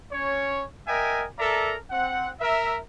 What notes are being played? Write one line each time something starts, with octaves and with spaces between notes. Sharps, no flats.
C#4 C#5
A#4 D#5 E5 G5 G#5
A4 A#4 D5 E5 A#5
C4 F#5
A#4 E5